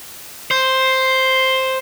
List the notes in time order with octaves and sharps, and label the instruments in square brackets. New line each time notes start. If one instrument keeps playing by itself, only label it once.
[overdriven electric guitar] C5